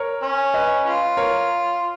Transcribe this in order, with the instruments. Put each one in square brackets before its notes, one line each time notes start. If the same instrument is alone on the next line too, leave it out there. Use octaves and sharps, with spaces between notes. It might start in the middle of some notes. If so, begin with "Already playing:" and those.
Already playing: [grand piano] A#4 C#5
[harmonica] C#4
[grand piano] B4 D#5
[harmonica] C#4 F4
[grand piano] A#4 C#5